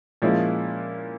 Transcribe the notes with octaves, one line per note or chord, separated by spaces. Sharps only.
A#2 F3 G#3 C#4 E4